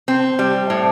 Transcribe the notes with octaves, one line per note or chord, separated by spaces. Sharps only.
C4
G3
A2